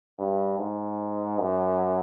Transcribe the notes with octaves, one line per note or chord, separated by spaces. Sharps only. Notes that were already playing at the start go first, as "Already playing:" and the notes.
G2
G#2
F#2